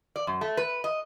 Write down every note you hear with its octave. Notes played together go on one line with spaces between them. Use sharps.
D5
F#2
A3
B4
D#5